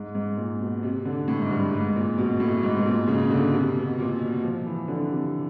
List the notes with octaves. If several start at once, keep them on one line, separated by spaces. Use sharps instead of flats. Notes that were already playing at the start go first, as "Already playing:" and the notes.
Already playing: G#2
G#2
A#2
B2
C3
D3
A2
G#2
G2
G#2
A#2
B2
A2
G#2
B2
A#2
C#3
D3
C3
B2
A#2
B2
F3
E3
D3
C3